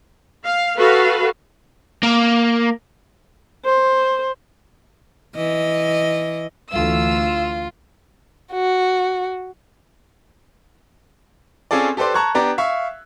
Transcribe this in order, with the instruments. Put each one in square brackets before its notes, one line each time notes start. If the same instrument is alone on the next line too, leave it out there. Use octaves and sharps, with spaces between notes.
[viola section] F5
F#4 A4 B4 F5
[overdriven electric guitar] A#3
[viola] C5
[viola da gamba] E3 D#5
[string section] D2 E3 E6 [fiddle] F4
[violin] F#4
[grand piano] C4 C#4 F4 G#4 A4 D5
G4 A4 B4 C5 D5
A5 A#5 C#6 F#6 G#6
B3 D4 G4 D5 A#5
E5 F5 C#6